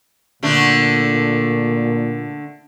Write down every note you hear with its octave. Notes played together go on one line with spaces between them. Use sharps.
A#2 D3 A3 D4